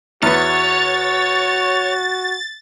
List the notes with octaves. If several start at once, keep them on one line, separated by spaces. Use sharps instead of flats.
E2 B3 F#4 C#5 A6